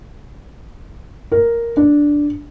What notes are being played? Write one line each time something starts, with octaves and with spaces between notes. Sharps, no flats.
A#4
D4